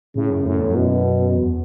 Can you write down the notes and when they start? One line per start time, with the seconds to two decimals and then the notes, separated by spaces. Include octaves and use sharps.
0.16 A2 C#3
0.30 F#2
0.45 F#2 A2
0.59 E2
0.70 F#2
0.76 B2
1.36 E2